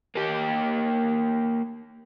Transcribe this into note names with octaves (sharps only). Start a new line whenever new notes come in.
A#3 G4